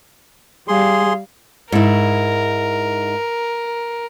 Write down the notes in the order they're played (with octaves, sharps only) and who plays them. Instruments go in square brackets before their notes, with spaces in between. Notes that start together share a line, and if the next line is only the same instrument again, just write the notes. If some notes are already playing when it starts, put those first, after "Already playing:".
[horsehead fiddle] G3 F5 [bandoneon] G#4 C6
[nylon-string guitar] G#2 E4 [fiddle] A#4